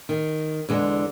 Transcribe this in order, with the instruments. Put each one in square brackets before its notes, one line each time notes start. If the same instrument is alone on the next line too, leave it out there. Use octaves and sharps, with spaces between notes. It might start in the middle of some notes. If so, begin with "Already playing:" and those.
[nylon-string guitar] D#3
E2 D3 G#3